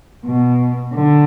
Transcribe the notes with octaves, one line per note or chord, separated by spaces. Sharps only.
B2
D3